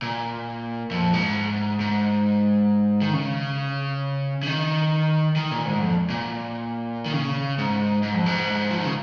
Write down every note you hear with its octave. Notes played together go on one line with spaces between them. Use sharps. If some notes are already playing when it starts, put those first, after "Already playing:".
A#2
F2
G#2
G#2
D#3
C#3
C#3
D#3
D#3
A#2
G#2
F2
A#2
D#3
C#3
G#2
G#2
F2
G#2
F3
D#3
C#3